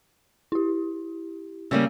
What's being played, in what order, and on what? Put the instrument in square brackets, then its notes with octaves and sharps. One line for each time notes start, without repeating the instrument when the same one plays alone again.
[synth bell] E4 G4
[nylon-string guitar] C#3 G3 A#3 [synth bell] E6 D#7